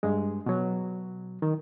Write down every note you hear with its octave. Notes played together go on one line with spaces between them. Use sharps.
G2 G#3
B2 F#3
D#3